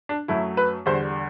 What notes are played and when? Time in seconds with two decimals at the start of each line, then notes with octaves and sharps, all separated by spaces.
0.09 D4
0.28 F#2 F#3 A3 E4
0.57 B4
0.86 E2 D3 G3 C5